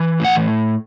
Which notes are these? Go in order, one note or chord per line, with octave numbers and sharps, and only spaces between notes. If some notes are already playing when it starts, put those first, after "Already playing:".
Already playing: E3
A2 F#5